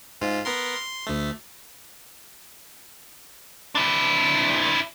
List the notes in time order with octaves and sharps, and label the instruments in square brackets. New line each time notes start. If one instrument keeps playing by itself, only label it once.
[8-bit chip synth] G#2 F4
B3 A#4 C6
C6
D2 A3
[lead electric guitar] D4 E4